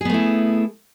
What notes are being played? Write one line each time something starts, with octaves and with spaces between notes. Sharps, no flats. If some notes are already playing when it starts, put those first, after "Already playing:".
A3 B3 E4 G#4